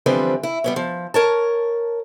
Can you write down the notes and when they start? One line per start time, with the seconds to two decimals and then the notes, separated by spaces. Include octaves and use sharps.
0.06 D3 E3 F3 G3 C4 B4
0.43 E4
0.64 G3 B3 C#4
0.76 F3
1.14 A#4 C#5 A5